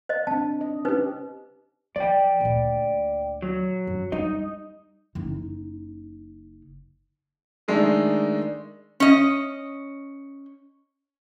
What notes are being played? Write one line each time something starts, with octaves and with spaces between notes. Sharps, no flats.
C5 D#5
C4 D4 A5
D#5
C#4 D#4 G4 B4 C5
F3 D5 G5
D2 A#2
F#3
F#2
G3 D#4 D#5
F#1 D#4
D#3 G#3 A3 D4 D#4
C#4 D#5